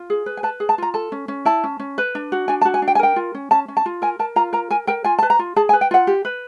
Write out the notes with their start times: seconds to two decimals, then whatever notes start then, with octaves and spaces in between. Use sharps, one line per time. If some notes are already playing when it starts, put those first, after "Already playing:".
Already playing: F4
0.10 G#4
0.26 B4
0.37 G#5
0.43 B4 A5
0.60 G#4
0.69 A5
0.78 F4 A#5
0.94 A4 A5
1.12 C#4
1.28 C#4
1.45 E4 A5
1.64 C#4
1.80 C#4
1.98 B4
2.15 D4
2.32 F#4
2.48 D4 G#5
2.61 A5
2.65 F#4
2.74 G#5
2.82 D4
2.88 G5
2.95 G#5
2.99 A#4 G5
3.16 F4
3.35 C#4
3.51 C#4 A5
3.68 C#4
3.77 A5
3.86 F4
4.02 A#4 G#5
4.19 A#4 A5
4.36 F4 A#5
4.53 A#4 A#5
4.70 A#4 G#5
4.87 A#4 G5
5.04 F4 G#5
5.18 B4 A5
5.30 A#5
5.39 F4
5.56 G#4 A5
5.69 G#5
5.73 B4
5.81 G5
5.91 F4 F#5
6.07 G4
6.25 B4